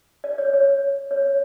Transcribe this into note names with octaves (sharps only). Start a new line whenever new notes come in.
D5
C#5
C#5
C#5